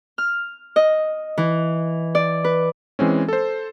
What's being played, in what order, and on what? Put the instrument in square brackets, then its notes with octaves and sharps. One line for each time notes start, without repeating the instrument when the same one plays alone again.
[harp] F6
D#5
E3
D5
B4
[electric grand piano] E3 G#3 C4 C#4
A4 C5